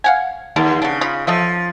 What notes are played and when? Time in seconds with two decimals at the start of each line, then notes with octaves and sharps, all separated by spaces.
0.04 F5 F#5 G#5
0.56 D#2 A4 A#4
0.82 C#3 B3 D4
1.01 D#4 F4 B5
1.27 F3 A4 D#5 E5